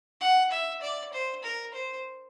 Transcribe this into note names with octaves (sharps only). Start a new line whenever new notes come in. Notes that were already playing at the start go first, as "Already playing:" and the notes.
F#5
E5
D5
C5
A#4
C5